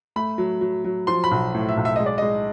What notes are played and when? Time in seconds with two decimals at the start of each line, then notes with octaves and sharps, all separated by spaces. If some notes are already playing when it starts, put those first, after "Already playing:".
0.16 A3 B5
0.38 F#3
0.61 F#3
0.85 F#3
1.07 F3 C6
1.24 B5
1.31 B1
1.54 A2
1.69 E5
1.77 B1
1.85 E5
1.96 G#3 D#5
2.06 D5
2.18 G#3 D#5